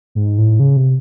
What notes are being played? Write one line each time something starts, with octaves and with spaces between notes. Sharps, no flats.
G#2
A2
C#3
C3